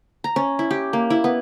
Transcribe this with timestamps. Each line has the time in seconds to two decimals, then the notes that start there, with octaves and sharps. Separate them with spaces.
0.24 A#5
0.36 C#4
0.59 E4
0.71 G4
0.93 A#3
1.10 E4
1.24 B3